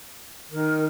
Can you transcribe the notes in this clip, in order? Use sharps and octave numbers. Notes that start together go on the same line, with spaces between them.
D#3 A#4